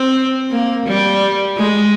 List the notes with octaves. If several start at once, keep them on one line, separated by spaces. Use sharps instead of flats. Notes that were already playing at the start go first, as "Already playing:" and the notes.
Already playing: C4
A#3
G3
G#3